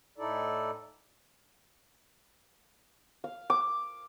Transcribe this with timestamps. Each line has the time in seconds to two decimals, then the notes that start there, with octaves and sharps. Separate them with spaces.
0.18 A2 D#4 E4 A4 D5
3.24 F5
3.50 D6